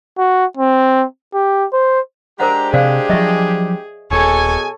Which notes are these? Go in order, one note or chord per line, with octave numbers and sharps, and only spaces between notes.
F#4
C4
G4
C5
G#3 D4 G4 A#4 C5 F#5 A#5
C3 G#4 C5 D5 F5
F3 F#3 D#5 E5 C#6
D#1 B2 G#4 A4 C#5 G#5